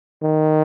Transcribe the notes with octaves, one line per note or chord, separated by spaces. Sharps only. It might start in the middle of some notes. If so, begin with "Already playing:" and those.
D#3